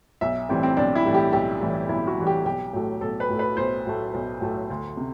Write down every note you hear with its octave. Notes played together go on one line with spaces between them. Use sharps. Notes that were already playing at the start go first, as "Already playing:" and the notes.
B1 E5
A2 E3 G3 C4
C4
B1 D4
E4
A2 E3 G3
G4
B1 G4
A2 E3 G3
B1 E4
F#4
A2 E3 G3
G4
B1 G4
A2 F#3 A3
B1 A4
B4
A2 F#3 A3
B4
B1 C5
A2 F#3 A3
B1
A2 F#3 A3
D2
C3